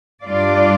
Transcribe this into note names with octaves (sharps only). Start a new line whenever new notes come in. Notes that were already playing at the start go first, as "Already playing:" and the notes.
G2 G3 D4 F4 D5